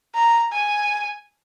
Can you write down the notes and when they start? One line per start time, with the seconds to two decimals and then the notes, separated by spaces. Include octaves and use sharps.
0.14 A#5
0.52 G#5